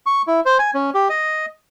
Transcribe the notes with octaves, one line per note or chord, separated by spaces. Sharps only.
C#6
E4
C5
G#5
C#4
G4
D#5